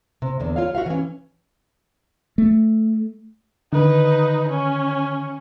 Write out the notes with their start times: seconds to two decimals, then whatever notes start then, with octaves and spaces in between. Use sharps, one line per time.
0.22 C3
0.40 E2 D3
0.56 F4 C#5 F5
0.75 F#4 E5 F5
0.86 E3 C#4
2.38 A3
3.73 D3 D#3 D#4 B4
4.49 C#4